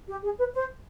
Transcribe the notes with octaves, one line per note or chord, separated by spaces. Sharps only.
G4
G#4
B4
C5